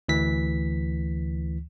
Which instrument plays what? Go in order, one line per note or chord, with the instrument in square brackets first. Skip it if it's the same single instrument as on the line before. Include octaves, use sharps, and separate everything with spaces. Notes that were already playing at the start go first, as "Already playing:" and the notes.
[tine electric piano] D2 E3 B6